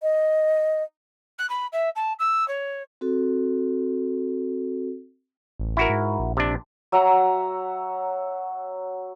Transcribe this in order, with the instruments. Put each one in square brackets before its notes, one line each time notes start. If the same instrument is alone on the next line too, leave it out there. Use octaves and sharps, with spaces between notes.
[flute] D#5
[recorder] F#6
B5
E5
A5
E6
C#5
[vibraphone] C4 F#4 A4
[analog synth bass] A1
[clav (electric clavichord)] E4 F#4 A#4
[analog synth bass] G#2
A#1
[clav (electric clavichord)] C3 D4
[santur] F#3 E5 F#5 A#5